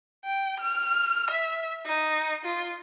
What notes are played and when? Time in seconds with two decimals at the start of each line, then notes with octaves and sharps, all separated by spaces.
0.25 G5
0.60 F6
1.30 E5
1.86 D#4
2.45 F4